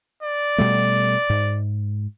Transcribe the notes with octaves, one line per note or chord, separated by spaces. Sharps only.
D5
B2 G3 A3
G#2